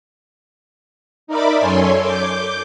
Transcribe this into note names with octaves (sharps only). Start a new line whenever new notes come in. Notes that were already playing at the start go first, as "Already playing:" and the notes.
D#4 A#4 D5 E5 B5 D6
F#2 A4 C#5 G#5 C6
D6 G6